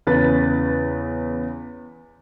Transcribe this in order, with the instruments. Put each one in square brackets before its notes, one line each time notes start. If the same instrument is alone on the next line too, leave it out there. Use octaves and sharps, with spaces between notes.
[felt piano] E2 C#3 B4 A6